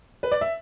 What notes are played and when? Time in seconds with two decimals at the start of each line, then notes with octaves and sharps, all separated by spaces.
0.23 B4
0.31 D5
0.41 E5